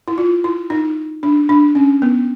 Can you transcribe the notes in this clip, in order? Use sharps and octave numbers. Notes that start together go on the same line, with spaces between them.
E4
F4
E4
D#4
D4
D4
C#4
B3